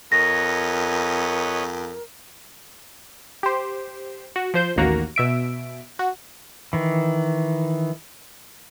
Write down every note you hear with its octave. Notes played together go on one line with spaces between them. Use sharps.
F2 A#4 B4 C#5 D#5 A#6
G4 C5
F#4
F3 C5 G6
A1 D#2 A#3 F#4 A#5
B2 E5 D7
F#4
D#3 E3